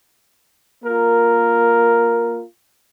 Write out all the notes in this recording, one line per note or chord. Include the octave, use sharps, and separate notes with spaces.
A#3 F4 A#4